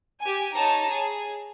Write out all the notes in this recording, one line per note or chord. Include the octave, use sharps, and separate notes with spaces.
G4 G#5
D#4 C#5 A5 A#5
G#4